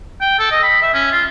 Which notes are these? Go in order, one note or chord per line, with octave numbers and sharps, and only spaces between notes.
G5
A4
D#5
B5
E5
C#4
F4